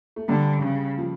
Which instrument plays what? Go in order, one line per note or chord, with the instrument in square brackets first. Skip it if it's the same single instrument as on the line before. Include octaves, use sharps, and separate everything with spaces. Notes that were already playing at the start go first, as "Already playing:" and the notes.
[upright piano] A3
[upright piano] G2 G3 [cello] D3
[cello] C#3
[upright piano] F3